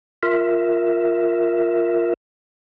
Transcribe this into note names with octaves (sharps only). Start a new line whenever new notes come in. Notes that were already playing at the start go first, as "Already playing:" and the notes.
F4 A#4 E5